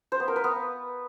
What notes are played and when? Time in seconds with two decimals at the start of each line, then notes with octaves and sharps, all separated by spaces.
0.12 C5
0.20 B3
0.28 A#4
0.36 B4
0.44 B3